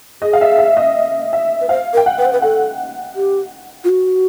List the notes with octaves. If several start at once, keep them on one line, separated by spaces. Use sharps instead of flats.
G#4 D#5
F5
E5
E5
D#5
E5
B4
C5 F5
A#4
G5
F#5
B4
C5
B4
A4 F#5
G4
F4
F#4